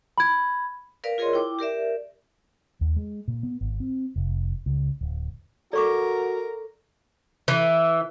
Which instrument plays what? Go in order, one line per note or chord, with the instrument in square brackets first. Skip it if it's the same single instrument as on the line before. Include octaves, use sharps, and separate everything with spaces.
[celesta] B5 G#6
[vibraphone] A#4 B4 D5 F5
F4 G#4 A#4 C#5 D#5 C6
E4 G5 D6
G4 A#4 D5 E5
[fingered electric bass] D#2
G#3
A#2
B3
G#1
C4
F1
C#2
D1
[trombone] F#4 [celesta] A4 [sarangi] A#4 [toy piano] D5 C#6 D6
[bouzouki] E3